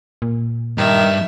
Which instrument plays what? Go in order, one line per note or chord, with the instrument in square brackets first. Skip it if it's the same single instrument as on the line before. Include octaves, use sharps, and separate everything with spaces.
[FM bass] A#2
[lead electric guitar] G2 [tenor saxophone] D#3 [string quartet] E5